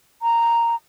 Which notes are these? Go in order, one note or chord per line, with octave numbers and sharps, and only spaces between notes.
A#5